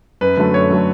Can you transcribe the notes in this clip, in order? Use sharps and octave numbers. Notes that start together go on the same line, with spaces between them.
F#2 B4
D3 F#3 A3
F#2 C#5
D3 F#3 A3